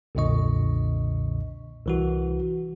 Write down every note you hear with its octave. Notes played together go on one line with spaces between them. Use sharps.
B1 F2 A#2 D3 D#5 C#6
C2 E3 F#4